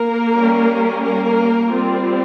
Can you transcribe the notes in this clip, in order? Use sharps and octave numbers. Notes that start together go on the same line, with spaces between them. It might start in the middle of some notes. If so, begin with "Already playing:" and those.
Already playing: A#3 A#4
G3 C#4
A#3 A#4
G3 C4 F4